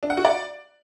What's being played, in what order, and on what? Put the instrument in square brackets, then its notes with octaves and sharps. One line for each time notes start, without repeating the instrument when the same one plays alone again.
[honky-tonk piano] D4
F#5
F#4
D5